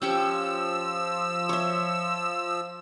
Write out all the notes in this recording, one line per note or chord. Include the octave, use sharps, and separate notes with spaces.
F3 C#4 G4 C#5 E6
C#5 E5